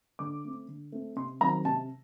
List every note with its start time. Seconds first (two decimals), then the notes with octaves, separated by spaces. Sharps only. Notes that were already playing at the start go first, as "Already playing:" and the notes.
0.19 D3 D6
0.44 A3 C4
0.68 D3
0.92 A3 C4
1.16 C3 C6
1.41 D#3 F#3 C4 A#5
1.65 C3 A5